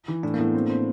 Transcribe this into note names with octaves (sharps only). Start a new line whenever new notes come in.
E3
A2 D4
A#3
A2 B3
C4
C4